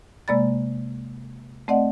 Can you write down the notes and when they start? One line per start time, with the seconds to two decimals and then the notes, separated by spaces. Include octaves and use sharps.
0.28 C3 G#3 A#3 D5 B5 A6
1.68 A3 C4 D5 D#5 F#5